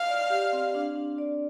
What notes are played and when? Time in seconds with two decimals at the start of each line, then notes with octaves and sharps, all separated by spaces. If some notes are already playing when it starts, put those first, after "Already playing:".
Already playing: D#5 F5
0.08 D5
0.30 G4
0.53 C4
0.75 D4
0.96 D4
1.18 D5